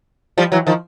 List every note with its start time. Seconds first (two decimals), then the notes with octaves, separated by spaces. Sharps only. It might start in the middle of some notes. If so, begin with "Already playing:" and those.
0.38 F3 G3
0.52 E3 F#3
0.67 D#3 F3